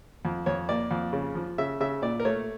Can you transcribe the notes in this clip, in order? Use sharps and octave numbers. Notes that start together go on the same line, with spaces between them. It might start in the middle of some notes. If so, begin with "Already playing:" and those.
F2
F2 C#5
A#3 D5
F2
C#3
F3
C#3 E5
C#3 E5
A#2 D5
A#4
A3 C#5